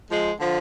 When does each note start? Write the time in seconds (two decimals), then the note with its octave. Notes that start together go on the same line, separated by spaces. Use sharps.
0.10 F3 G#3
0.40 D3 F3